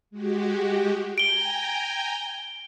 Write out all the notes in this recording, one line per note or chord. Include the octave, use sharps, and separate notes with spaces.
G#3 F#4 G4
G5 G#5 A#5 D7 G7